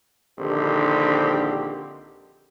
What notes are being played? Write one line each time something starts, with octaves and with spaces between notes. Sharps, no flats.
A#1 D3 D#3 C4 G4